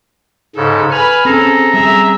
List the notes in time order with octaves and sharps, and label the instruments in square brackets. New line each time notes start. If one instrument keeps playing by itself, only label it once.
[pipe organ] G#2 C#3 [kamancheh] A4
[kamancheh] B4 B5 [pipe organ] G#5 F6
[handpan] C4 C#4 [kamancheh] G#4 A4 [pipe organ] A#5
[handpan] G3 [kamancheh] G#4 E5